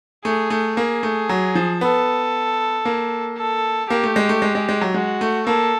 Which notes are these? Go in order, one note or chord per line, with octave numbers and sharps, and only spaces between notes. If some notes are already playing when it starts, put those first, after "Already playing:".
A3 G#4
A3
A#3 G#4
A3
F#3
F3
B3 A4
A#3
A4
A#3 G4
A3
G#3
A3
G#3
G#3
G#3
F#3
G#3 F#4
A3
A#3 A4